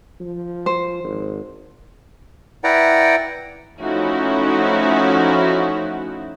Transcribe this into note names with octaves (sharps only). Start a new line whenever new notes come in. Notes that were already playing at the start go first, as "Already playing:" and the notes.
F3
C5
G#1
E4 B4 D5 F#5 G5 A#5
F3 A3 C#4 D#4 E4 F#4